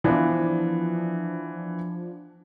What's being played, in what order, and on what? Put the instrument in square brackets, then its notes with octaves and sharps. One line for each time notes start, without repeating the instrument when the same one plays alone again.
[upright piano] E3 B3 [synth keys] F3 D4